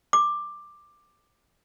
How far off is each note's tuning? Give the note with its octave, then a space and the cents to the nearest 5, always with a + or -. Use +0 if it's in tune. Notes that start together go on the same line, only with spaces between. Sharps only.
D6 +10